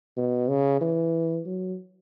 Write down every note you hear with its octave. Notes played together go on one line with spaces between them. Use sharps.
B2
C#3
E3
F#3